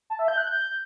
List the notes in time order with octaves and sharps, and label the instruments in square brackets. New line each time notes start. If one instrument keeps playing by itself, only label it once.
[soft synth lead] A5
E5
G6
F#6
G6